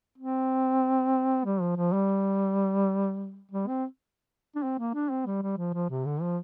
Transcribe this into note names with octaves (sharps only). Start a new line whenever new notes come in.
C4
G3
F3
F3
G3
G3
C4
D4
C4
A#3
D4
C4
G3
G3
F3
F3
C3
D3
F3